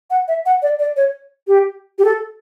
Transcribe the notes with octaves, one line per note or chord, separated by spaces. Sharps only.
F#5
E5
F#5
D5
D5
C#5
G4
G4
A4